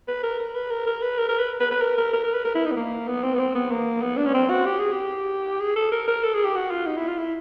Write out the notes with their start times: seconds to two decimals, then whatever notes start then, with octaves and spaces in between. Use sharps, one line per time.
0.08 B4
0.23 A#4
0.39 A#4
0.55 B4
0.71 A#4
0.87 A#4
1.03 B4
1.19 A#4
1.29 A#4
1.39 B4
1.60 B4
1.71 B4
1.81 A#4
1.98 A#4
2.13 A#4
2.24 A#4
2.34 B4
2.45 A#4
2.55 E4
2.66 D#4
2.71 B3
2.76 A#3
3.08 B3
3.23 C4
3.34 B3
3.39 C4
3.55 B3
3.71 A#3
4.02 B3
4.17 D4
4.26 C#4
4.34 C4
4.50 F#4
4.66 G4
4.79 G#4
4.92 G4
5.60 G#4
5.76 A4
5.92 A#4
6.08 A#4
6.24 A4
6.34 G#4
6.45 G4
6.55 F#4
6.71 F4
6.86 D#4
6.97 E4
7.08 F4
7.18 E4